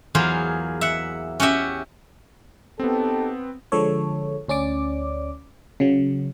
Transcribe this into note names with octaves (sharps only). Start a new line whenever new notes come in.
E2 F#3 A#3 F4 G#4 C5
E5 F#5
C#4 F#4 G4 E5
B3 C4 D#4 G4 A4
D3 F3 G#3 A4 C#5
D2 C#4 D5 D6
C#3 F#3